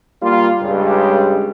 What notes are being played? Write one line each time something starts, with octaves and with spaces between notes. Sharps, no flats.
G3 A#3 F4
C#2 G2 C#3 G3 G#3